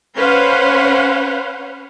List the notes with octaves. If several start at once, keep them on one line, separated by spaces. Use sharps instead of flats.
C#4 B4 C5 F5 F#5